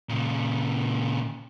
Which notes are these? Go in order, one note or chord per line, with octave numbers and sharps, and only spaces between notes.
A#2 C#3